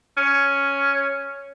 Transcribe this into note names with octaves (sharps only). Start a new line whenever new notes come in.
C#4